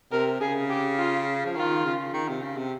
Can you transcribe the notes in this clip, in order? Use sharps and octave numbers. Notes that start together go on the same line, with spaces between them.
C3 A#4
C#3 G#4
G4
F4
F3
D#3 F4
C#3
D#3
C3
C#3
C3